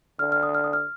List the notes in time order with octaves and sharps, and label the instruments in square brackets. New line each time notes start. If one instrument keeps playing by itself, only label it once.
[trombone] D3 [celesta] F6
[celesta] F6
D#6
F6
D#6
F6